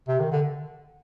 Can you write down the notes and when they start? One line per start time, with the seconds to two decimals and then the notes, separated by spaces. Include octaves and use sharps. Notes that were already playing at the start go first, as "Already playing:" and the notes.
0.08 C3
0.20 D#3
0.32 D3